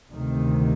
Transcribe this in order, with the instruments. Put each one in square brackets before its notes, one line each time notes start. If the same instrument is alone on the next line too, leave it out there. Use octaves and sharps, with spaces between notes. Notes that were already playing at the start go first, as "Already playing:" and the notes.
[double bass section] D2 C3 D#3